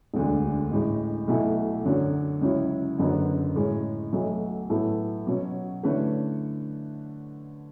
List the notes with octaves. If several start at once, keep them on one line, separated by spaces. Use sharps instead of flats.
E1 D2 D3
A1 A2 G#3
B1 B2 A3 E4
F#2 D3 F#3 C#4
C#2 C#3 F#3 C#4 E4
F#1 F#2 D3 F#3 B3
A2 G#3 C#4 G#4
B1 B2 F#3 A3
A2 F#3 B3 E4 A4
B2 F#3 C#4
D3 A3 C#4 E4 B4